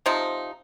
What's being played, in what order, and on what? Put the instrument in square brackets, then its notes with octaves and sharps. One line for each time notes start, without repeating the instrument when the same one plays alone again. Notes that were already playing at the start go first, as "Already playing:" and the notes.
[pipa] C3 F3 C4 D#4